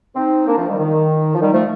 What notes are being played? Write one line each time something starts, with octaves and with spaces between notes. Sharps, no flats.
C4 D#4
A#3 D4
F3 A3
D#3 G3
D#3
F3
D#3 G3
F3 A3